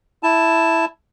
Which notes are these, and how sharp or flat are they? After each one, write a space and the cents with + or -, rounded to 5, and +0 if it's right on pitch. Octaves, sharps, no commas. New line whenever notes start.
E4 +0 A5 +0